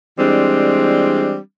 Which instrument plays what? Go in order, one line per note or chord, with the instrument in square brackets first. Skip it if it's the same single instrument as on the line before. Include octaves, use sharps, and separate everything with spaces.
[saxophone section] E3 G3 G#3 C4 D4